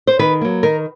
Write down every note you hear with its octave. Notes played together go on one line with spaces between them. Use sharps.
C5
D#3 B4
F#3 A#3
D#3 A#4